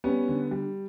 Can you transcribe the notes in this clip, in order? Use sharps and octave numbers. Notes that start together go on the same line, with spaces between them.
G3 B3 C#4
D3
G3